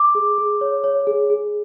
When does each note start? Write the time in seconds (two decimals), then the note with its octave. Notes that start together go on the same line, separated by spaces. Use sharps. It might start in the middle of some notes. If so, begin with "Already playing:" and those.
Already playing: D6
0.15 G#4
0.38 G#4
0.61 C#5
0.84 C#5
1.07 G#4
1.30 G#4